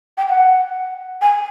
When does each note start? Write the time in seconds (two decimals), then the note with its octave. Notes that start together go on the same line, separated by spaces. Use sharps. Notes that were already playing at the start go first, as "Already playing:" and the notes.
0.17 G5
0.29 F#5
1.21 G#5